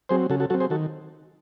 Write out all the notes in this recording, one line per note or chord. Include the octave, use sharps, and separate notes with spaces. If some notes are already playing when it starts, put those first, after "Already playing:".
F#3 C4 G#4 C5
C#3 F#4 A4
F#4 A4
F#3 C4 F#4 A4
G#4 C5
D#3 F#4 A4